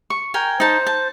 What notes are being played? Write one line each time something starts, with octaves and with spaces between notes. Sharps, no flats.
C#6
A#4 G5 G#5
D#4 C5 A5
A5